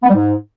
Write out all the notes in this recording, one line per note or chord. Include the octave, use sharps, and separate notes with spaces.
B3
G3
G#2